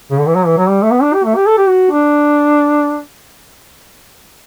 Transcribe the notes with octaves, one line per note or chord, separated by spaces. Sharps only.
C#3
D3
E3
F#3
E3
F#3
G3
A3
B3
D4
G4
A3
G4
A4
G4
F#4
D4